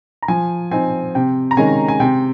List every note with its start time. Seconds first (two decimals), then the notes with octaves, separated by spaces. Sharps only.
0.22 A#5
0.28 F3 G#5
0.71 C4 D#4 G#5
1.15 C3 G5
1.51 A#5
1.57 D#3 G#3 C#4 G#5
1.88 G#5
2.00 C3 G5